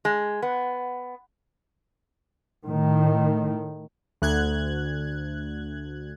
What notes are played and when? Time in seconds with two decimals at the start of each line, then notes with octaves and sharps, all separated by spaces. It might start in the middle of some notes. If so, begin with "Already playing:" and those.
0.05 G#3
0.42 B3
2.66 A2 D#3
4.22 D2 F#6 G#6